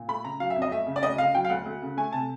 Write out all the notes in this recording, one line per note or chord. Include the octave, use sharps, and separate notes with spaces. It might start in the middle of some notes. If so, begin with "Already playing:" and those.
Already playing: A#2
A3 B5
C#3 A#5
F#3 F5
E5
F2
D#5
A3 E5
C#3
D5
D2 D#5
C#3 F5
F#3 G5
F5
D2 F#5
D2
C#3
A3 G#5
C3 A5